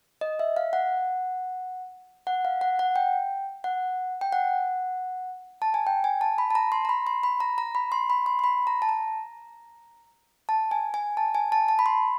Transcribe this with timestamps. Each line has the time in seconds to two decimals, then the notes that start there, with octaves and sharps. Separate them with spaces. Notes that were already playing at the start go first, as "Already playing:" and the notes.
0.21 D#5
0.39 E5
0.57 F5
0.73 F#5
2.27 F#5
2.45 F5
2.61 F#5
2.79 F#5
2.96 G5
3.64 F#5
4.21 G5
4.32 F#5
5.62 A5
5.74 G#5
5.87 G5
6.04 G#5
6.21 A5
6.38 B5
6.50 A5
6.55 A#5
6.72 C6
6.85 A#5
6.89 B5
7.07 C6
7.23 B5
7.40 A#5
7.58 A#5
7.75 B5
7.92 C6
8.10 B5
8.26 C6
8.39 C6
8.44 B5
8.67 A#5
8.82 A5
8.89 A#5
10.49 A5
10.71 G#5
10.94 G#5
11.17 A5
11.35 G#5
11.52 A5
11.68 A5
11.79 B5
11.86 C6